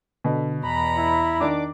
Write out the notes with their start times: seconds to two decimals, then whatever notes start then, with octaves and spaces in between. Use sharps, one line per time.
0.24 B2 D3
0.63 E2 A#5 B5
0.97 E4
1.40 D#3 D4 D6